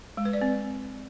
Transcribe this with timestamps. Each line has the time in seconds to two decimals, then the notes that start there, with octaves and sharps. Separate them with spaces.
0.17 G#3
0.25 B4
0.33 D5
0.41 C4